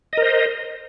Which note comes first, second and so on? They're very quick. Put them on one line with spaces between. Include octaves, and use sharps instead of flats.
D#5 A#4 C5